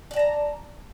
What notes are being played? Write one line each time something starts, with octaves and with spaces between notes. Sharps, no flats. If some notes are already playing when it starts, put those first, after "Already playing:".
D5 G5 A5 A#5